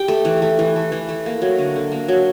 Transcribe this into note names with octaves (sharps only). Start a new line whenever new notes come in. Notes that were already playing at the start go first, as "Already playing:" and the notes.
Already playing: G4 G5
A3
E3
A3
E3
A3
E3
A3
A#3
F#3
D3
D3
A#3
F#3